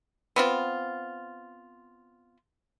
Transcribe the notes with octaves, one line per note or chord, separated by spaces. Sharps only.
B3 C4 F4